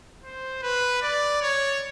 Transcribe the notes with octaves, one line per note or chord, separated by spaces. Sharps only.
C5
B4
D5
C#5